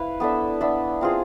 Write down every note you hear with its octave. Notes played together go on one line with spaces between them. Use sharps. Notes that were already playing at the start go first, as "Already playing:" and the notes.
Already playing: E4 B4 F5
B3 D4 A4 E5
B3 D4 A4 E5
C4 F4 G#4